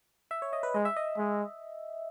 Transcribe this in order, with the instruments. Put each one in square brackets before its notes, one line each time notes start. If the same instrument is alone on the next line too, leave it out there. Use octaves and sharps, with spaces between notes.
[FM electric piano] E5
C#5
D#5
B4
[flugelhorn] G#3 [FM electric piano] D#5
[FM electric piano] E5
D#5
[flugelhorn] G#3